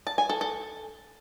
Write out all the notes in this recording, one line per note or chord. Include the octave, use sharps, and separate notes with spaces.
A5
G#5
A4
A4